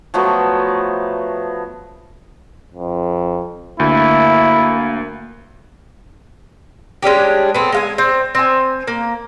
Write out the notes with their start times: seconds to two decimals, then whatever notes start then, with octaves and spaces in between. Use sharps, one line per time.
0.14 F3 F#3 A3 B3
2.74 F2
3.80 D2 A#3 E4
7.03 G#3 C#4 D4 G4
7.54 B3 C4 A4
7.72 G#3 F5 G#5
7.98 C4
8.35 C4 G#5
8.87 A#3